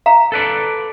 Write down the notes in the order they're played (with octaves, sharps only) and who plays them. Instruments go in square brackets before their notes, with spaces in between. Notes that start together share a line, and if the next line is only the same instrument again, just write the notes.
[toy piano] F5 A#5
[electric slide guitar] A4 B4 D5